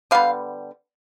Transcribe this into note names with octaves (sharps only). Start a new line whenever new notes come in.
D3 G3 B3 F5